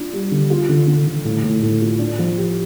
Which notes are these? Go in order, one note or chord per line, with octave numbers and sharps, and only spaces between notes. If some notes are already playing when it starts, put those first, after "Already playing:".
Already playing: D4 F4
G3
D3
F4
D3
D3
D3
A2
A2
A2
F4
D4
F3
G4